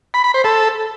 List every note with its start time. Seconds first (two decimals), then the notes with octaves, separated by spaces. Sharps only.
0.14 B5
0.24 B5
0.34 C5
0.44 A4